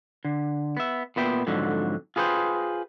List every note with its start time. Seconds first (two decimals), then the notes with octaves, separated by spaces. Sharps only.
0.25 D3
0.77 B3 E5
1.16 A#2 B3 E5 G5
1.47 F2 G#2 D3 F#3
2.16 F4 G#4 B4 C5 G5